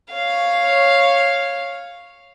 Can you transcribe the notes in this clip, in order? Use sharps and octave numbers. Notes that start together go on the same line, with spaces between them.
C#5 F5